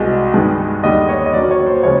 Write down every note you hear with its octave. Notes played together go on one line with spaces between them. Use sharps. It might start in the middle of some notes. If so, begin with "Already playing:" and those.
Already playing: C2 B2 G#3 D#5
G2 D#3 G#3 B3
D#2 D3 G3 D#5
C#5
D#5
B2 F#3 A#3 D4 D5
C#5
C5
C#3 F3 G#3 C#5